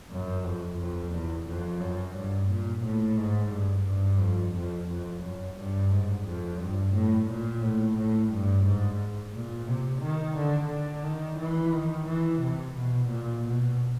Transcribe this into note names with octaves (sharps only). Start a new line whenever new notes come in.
F#2
F2
F2
E2
F2
F#2
G2
A#2
A2
G#2
G2
G2
F2
F2
F2
F#2
G2
G#2
F2
G2
A2
A#2
A2
A2
G2
G#2
A#2
C3
D#3
D3
D3
D#3
E3
D#3
E3
C3
B2
A#2
B2